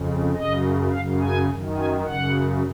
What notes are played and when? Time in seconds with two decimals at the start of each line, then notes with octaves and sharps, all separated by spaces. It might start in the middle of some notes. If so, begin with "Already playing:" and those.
Already playing: F2 C#3
0.35 F#2 C#3 D#5
0.92 F#2 C#3 F5
1.21 G#5
1.49 F#2 D#3
1.77 G#5
2.06 F#2 C#3 F#5